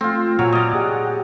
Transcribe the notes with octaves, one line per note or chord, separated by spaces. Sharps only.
A3 C4 F4
A#2 F#3 G#5 F6
D5 D#5
G4 G#4 F#5